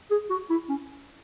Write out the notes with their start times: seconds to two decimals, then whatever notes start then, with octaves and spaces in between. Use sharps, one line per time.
0.11 G#4
0.30 F#4
0.50 E4
0.69 C#4